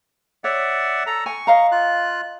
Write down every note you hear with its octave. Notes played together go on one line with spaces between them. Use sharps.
C#5 D5 E5 F#5
A4 A#5
G#5 C#6
D#5 F5 A#5
F4 F#6